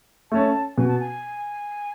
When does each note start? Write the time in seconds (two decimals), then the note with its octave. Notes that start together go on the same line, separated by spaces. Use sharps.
0.31 A3 C#4 A5
0.77 B2 G#5
0.88 A5
1.00 G#5